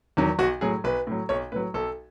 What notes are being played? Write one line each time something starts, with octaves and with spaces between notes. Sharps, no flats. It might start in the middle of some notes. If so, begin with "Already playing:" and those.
E2 D#3 F#3
B1 F#4
A2 F#3 G#4
B1 B4
A2 F#3
B1 C#5
A2 F#3 B4
B1 A4